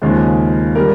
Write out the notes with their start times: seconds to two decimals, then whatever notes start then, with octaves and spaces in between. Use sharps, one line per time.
0.02 D#2 C#3 F3 G#3
0.75 C#3 G3 A#4